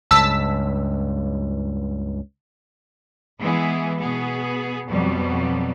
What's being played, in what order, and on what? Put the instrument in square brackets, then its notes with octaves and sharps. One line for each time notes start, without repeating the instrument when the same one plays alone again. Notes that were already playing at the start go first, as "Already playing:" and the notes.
[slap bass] C#2 G2 [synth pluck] A5 E6 B6
[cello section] E3 G#3 B3 E4 G#4
B2 B3 G#4
F2 B2 F#3 G3